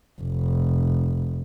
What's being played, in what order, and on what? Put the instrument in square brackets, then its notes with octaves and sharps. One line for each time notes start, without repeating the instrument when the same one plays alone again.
[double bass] F1